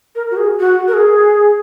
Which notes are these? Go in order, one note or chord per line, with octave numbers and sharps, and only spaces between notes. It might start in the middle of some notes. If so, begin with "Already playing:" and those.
A#4
F#4
G#4
F#4
A#4
G#4